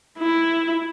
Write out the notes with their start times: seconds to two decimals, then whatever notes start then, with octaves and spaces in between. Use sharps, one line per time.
0.19 E4